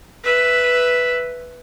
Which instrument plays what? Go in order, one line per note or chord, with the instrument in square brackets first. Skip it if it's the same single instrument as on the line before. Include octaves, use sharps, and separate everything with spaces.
[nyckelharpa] B4 E5